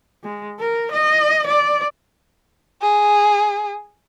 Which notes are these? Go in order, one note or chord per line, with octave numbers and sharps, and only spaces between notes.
G#3
A#4
D#5
D5
G#4